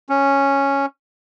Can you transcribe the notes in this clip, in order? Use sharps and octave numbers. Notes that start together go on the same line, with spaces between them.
C#4